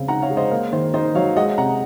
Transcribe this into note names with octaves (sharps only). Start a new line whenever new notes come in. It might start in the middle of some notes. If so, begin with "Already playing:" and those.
Already playing: C#3 C4
D#4 F#5 A#5
C#5 F5
G#3
C5 D#5
A#3
D#3 C5
D#4 C5 D#5
F#3 C#5 F5
G#3 D#5 F#5
C3 F#5 A#5